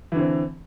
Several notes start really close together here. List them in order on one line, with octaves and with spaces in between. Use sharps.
E3 D3 C4